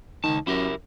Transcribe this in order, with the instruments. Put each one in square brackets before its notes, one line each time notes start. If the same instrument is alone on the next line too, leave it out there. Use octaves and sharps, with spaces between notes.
[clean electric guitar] C#2 F3 A5 [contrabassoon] D#3
[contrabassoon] F#2 [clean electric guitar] E4 G4 A#4